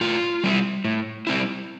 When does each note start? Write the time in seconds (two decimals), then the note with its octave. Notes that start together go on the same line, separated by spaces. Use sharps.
0.01 A2 F4
0.44 G3 C4 E4
0.85 A2
1.27 G3 C4 E4